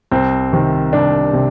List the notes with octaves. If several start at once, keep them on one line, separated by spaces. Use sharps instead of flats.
C2 C4
C3 D#3
C2 D4
C3